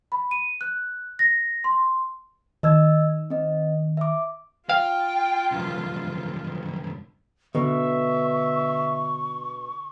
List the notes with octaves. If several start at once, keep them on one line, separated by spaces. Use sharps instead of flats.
B5
D#7
F#6
A#6
C6
D#3 D#5 E6 G#6
C4 D#5
E5 D6
F4 F5 G5
C2 F#2
B2 D3 E5 C#6